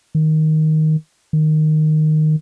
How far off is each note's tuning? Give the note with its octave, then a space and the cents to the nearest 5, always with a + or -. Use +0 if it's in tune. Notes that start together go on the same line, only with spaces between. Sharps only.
D#3 +5
D#3 -10